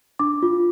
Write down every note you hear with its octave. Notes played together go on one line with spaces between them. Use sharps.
D4 D6
F4